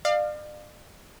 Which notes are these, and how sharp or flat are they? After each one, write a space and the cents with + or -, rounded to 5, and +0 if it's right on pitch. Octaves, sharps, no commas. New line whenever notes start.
D5 +40 F5 +0